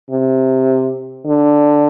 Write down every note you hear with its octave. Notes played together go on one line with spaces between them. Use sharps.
C3
D3